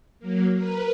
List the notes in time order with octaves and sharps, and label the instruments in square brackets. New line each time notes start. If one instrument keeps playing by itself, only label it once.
[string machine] F#3 A#3
A#4 B4